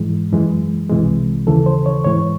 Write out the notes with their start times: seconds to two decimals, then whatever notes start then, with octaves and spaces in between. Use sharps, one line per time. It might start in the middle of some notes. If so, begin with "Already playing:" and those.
Already playing: G#2 E3 G#3
0.32 F#2 E3 G#3
0.90 C2 C3 E3 G#3
1.47 D#2 C#3 E3 A4
1.66 C5
1.86 C#5
2.04 G#2 E3 G#3 C#5